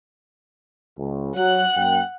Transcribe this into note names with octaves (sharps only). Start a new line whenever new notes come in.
C#2
F#3 F#5 F#6
F#2 A#3 G5